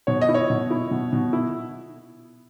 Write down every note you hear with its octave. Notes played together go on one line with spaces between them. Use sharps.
B2 C#5
D#5
E4
C#5
B2
E4
B2
B2
E4